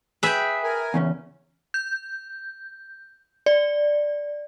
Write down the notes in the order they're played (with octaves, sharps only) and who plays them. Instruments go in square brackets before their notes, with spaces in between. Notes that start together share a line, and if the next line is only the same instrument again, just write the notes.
[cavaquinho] G#4 G5 [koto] B4 E5
[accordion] A#4 G#5
[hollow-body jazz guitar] E2 C#3 C#4
[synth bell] G6
D5